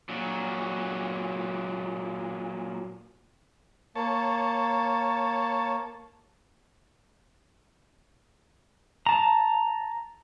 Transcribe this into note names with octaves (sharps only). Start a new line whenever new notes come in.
A#2 F#3
A#3 C#5 A5
A5 A#5